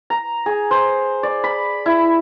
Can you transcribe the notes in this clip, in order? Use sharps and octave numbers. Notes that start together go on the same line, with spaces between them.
A#5
G#4
C5
D5
B5
E4